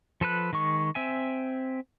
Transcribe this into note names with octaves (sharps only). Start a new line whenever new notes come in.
F3 A4 B4 F#6
D#3 G#3 C#6
C4 E5 G#5